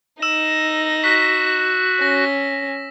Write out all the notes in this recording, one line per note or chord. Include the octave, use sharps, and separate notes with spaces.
D#4 E6 A#6 E7
F#4 F#6 B6
C#4 A#6